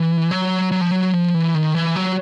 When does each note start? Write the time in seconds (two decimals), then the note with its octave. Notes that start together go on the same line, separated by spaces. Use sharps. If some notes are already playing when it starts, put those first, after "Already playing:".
Already playing: E3
0.31 F#3
0.72 F#3
0.81 F3
0.91 F#3
1.13 F3
1.34 E3
1.54 D#3
1.75 E3
1.96 F#3